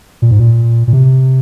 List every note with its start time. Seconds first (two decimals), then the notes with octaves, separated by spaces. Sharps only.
0.22 A#2
0.31 G#2
0.40 A#2
0.87 A#2
0.93 C3